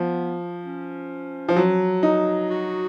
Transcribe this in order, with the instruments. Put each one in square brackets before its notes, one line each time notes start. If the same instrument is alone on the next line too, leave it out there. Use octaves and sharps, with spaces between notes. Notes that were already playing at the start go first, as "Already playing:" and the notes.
Already playing: [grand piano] F3 [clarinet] B3
[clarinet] C#4
[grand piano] F3
F#3
D#4
[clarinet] F#4